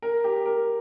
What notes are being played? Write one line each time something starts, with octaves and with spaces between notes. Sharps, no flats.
A#4
G4
A#4